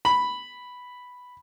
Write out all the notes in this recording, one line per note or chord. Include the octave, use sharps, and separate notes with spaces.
B5